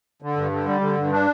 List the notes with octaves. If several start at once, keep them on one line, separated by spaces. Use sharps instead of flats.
D3
G2
D3
G3
D3
G2
D4